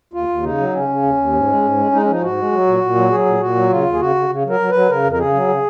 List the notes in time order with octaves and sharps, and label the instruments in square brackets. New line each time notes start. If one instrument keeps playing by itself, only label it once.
[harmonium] D#2 F4
D#2
C#3 D#4
F#3
C#3 C#4
C#3
D#2
D#2
G#2
G#3
G#2
G#3
G#3 D#4
C#4
F3 D#4
G#2 F#4
G#3
F#3
A#2
A#2
F#3
F#3 G#4
A#2
A#2 F#4
F#3
C#3 F4
D#2
G#4
C#3 F#4
C#3
C#3
F#3
A#4
F#3
F#3 B4
C#3 A#4
F2
A#4
C#3 G#4
F#3
C#3